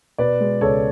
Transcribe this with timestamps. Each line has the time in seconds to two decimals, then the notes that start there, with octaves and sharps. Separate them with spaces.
0.18 B2 B4 D5
0.40 G#3
0.61 C#2 A4 C#5